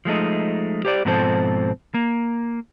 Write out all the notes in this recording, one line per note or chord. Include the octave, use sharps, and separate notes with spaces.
F3 G#3 A3 D#4
G4 C5 D5
G#2 B2 F3 C4 A4 C5
A#3